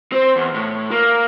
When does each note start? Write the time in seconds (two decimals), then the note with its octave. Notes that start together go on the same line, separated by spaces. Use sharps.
0.12 C4
0.36 E2
0.54 A2
0.91 A#3